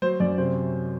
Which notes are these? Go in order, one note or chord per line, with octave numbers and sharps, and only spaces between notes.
F#3 C5
F#2 D5
C3 C5